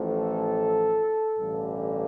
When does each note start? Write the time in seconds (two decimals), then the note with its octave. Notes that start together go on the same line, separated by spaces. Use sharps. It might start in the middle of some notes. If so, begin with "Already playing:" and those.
Already playing: A1 A2 F3
0.12 A4
1.36 A1 G2 D3